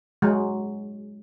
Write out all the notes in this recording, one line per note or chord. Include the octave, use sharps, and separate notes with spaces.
F#3 G#3